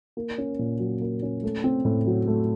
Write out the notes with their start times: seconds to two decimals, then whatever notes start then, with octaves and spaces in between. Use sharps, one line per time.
0.17 A#3
0.38 C#4
0.59 A#2
0.80 F#3
1.01 A#3
1.23 C#4
1.43 A3
1.64 C4
1.85 A2
2.06 F#3
2.28 A3